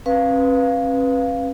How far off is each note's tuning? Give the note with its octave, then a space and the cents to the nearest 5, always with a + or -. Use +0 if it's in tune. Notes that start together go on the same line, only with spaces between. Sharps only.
C#4 -45 B4 +0 F5 -5